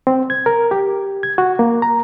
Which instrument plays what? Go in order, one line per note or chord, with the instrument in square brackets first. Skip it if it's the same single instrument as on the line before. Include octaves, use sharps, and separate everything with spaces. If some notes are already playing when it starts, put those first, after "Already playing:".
[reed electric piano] C4
G#6
A#4
G4
G#6
F#4
A#3
A#5